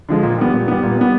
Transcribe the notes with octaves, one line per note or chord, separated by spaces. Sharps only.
D3 F3 G#3
A#2
G3 B3
A#2
G3 B3
A#2
G3 B3